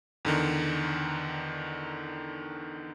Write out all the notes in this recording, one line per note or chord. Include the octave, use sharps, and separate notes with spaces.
E2 D3 D#3